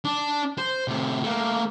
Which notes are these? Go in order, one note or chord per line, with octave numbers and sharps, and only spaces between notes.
D4
C5
A2 C3
A3 A#3